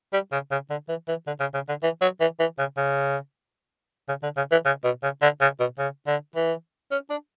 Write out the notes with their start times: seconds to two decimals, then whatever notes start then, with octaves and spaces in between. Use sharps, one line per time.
0.13 G3
0.32 C#3
0.51 C#3
0.70 D3
0.89 E3
1.08 E3
1.27 D3
1.40 C#3
1.54 C#3
1.69 D3
1.83 E3
2.02 F#3
2.21 E3
2.40 E3
2.59 C#3
2.77 C#3
4.09 C#3
4.23 D3
4.37 C#3
4.52 E3
4.66 C#3
4.84 B2
5.03 C#3
5.22 D3
5.41 C#3
5.60 B2
5.79 C#3
6.07 D3
6.36 E3
6.92 C#4
7.10 D4